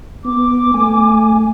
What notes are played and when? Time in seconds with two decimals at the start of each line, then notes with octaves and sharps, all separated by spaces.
0.25 B3 D6
0.74 A3 G#5